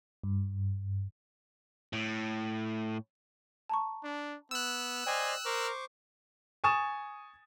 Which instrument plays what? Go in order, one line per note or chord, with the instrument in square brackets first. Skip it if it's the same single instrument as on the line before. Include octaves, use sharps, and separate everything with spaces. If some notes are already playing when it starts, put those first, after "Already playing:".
[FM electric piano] G2
[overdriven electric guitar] A2
[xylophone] A5 A#5 C#6
[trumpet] D4
[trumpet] B3 [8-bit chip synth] E6 F#6
[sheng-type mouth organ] C5 D5 D#5 [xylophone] G5 [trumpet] G#5
[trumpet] A#4 [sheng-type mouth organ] C5 C#6 D6
[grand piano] G#5 C#6 D#6 A6 E7